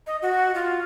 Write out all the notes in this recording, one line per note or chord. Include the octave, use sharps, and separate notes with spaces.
D#5
F#4
F4